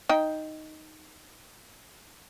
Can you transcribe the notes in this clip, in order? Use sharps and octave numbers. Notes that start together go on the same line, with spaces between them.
D#4 G5